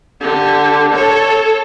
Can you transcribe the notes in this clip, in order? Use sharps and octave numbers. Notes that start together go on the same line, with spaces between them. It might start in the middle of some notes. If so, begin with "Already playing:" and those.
D3 G4
A4 C#5